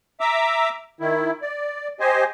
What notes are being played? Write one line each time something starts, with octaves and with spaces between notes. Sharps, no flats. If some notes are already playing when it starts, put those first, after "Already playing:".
E5 A#5 D6 E6
D#3 E4
D5
G4 C5 D#5 G#5